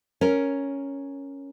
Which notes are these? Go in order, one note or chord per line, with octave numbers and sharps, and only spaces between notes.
C#4 A#4